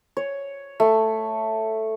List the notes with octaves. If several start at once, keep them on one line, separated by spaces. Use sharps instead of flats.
C#5
A3